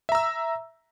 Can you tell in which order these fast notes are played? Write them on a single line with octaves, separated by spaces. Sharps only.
E5 A#5 E6